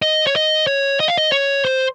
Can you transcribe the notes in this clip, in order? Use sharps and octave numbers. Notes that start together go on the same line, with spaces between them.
D#5
C#5
D#5
C#5
D#5
F5
D#5
C#5
C5